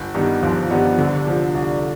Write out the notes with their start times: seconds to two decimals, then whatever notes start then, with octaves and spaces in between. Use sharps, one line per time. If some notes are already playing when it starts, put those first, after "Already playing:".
Already playing: G1
0.14 G2 D#3 G3 B3
0.42 G1 F3
0.70 G2 D#3 G3 B3
0.98 C2 D3
1.26 C3 F3
1.54 C2